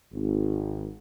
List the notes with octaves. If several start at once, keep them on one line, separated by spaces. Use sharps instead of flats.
G#1